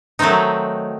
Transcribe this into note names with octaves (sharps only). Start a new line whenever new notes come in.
D#3 F#3 A3 C4 D#4